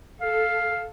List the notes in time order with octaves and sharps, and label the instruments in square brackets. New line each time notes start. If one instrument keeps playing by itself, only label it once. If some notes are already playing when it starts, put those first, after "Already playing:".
[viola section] A4 [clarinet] F5